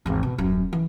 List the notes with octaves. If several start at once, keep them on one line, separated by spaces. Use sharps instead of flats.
G#1 E2
B2
D#1 F#2
E3